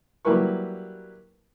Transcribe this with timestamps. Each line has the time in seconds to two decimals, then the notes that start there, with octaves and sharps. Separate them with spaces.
0.25 F#3 G3 A#3 E4 B4 C#6